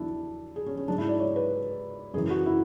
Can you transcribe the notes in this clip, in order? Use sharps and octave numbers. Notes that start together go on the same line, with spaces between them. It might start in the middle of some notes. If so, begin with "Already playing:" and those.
Already playing: E2 D3 F#3 D4 E4
G#4
C#4
C#4
G#2 F#3 D4
E4
D5
C#5
B4
F#2 E3 G#4
F#4
E4